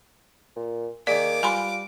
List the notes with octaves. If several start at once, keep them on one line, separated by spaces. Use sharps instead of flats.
A#2
D#3 A#3 G#4 D5 D6
G3 F4 B4 G#5 B5 C6